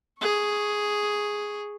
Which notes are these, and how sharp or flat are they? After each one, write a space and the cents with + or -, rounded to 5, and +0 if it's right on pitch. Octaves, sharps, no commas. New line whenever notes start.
G#4 +0 C#6 +0